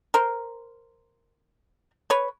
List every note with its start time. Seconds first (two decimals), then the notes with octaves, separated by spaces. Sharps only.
0.14 A#4 C5
2.10 B4 C#5